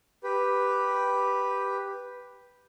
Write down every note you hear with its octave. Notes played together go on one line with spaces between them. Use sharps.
G4 B4